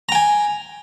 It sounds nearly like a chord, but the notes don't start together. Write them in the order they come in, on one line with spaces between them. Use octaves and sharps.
A#5 G5 G#5